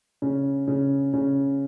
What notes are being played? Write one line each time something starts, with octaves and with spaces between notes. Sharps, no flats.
C#3
C#3
C#3